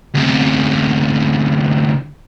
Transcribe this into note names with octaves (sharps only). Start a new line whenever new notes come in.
D2 C3